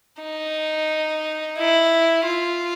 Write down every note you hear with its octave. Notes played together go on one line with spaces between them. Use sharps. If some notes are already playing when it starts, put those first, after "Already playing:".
D#4
E4
F4